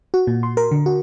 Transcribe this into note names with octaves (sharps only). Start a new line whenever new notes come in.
F#4
A#2
C6
A#4
D3
F#4